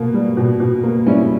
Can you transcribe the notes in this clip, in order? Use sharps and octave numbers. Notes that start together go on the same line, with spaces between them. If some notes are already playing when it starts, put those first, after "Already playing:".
Already playing: B2 A#3
G3
B2
B2
A#3
G3 C#4 E4